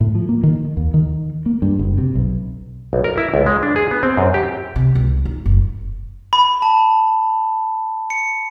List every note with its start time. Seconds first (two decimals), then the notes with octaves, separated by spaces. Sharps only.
0.01 A2
0.15 F3
0.29 A#3
0.43 D#3
0.77 D#2
0.94 D#3
1.46 A#3
1.62 G2
1.79 F#1
1.98 C3
2.15 B1
2.93 B1
3.04 A#4
3.18 E4
3.34 C#2
3.46 G#3
3.63 D4
3.76 G#4
3.91 B3
4.03 C4
4.17 F#2
4.34 G4
4.76 C3
4.95 C#2
5.25 D#4
5.46 F#1
6.33 B5
6.62 A5
8.10 C#7